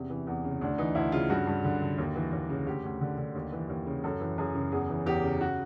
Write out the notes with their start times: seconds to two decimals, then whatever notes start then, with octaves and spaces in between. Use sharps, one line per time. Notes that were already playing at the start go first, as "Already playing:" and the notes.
Already playing: E2 C3 C#4
0.10 E3
0.27 E2
0.44 C#3
0.61 D2 D4
0.78 E3 D#4
0.95 D2 E4
1.12 C#3 F4
1.29 G2 F#4
1.47 G2
1.64 D3
1.81 D3
1.98 D#2
2.15 E3
2.33 D#2
2.49 C#3
2.66 D2 G4
2.84 D2
3.01 D3
3.18 D3
3.35 D#2
3.52 E3
3.69 D#2
3.86 C#3
4.04 F#2 A4
4.20 E3
4.38 F#2 G#4
4.55 C#3
4.72 E2 G#4
4.90 E3
5.06 E2 G4
5.23 C#3
5.41 F#4